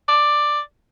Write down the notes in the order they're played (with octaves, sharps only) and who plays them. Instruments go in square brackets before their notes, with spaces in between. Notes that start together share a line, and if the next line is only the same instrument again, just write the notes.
[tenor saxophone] D5